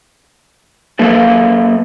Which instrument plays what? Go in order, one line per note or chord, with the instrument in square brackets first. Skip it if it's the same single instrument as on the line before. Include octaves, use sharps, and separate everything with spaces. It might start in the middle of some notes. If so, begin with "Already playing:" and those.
[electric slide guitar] F#3 A#3 A4 B4